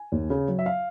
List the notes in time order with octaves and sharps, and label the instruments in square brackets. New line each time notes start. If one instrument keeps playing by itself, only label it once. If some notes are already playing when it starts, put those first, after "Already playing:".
Already playing: [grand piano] G#5
D#2
C#3
F#3
E5
F5